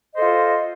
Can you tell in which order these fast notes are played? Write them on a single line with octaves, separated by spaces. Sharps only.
D#5 C5 A4 F4